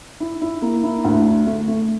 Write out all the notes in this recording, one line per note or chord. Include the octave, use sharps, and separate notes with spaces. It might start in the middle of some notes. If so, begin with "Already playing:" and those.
E4
E4
A#3
E4
D2
D4
A3
A3